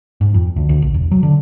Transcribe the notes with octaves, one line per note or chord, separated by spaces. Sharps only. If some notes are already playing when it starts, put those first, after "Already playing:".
G#2
F2
D2
D2
A#1
E1
F#3
D3